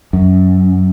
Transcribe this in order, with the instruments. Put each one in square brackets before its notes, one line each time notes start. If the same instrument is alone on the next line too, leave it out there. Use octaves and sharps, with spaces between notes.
[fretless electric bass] F#2